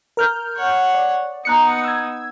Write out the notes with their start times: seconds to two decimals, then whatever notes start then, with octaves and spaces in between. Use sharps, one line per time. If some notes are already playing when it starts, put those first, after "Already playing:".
0.17 A#4 F6 G6
0.57 C#5 F#5
0.94 D5
1.45 B3 D#4 A#5 F#6 C#7
1.85 E6 G#6